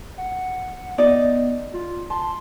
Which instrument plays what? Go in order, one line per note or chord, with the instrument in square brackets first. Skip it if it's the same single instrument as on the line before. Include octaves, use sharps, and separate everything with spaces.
[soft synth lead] F#5
[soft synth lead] B3 [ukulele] D#4 D5 D#5
[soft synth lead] F4
[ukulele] A5 [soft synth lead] C6